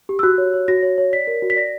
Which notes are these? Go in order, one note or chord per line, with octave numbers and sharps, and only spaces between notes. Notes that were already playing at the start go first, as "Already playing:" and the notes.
G4
E6
F#4 F#6
C#5
C#5
F#4 A#6
C#5
C#5
D5 B6
A#4
F#4
B6
D5 A#6